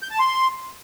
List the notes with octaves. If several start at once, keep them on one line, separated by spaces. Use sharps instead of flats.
G6
A5
C6